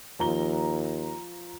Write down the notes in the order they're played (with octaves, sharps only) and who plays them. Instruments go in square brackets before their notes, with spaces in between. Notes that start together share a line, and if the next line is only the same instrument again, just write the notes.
[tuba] D#2 [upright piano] F3 A#5 G7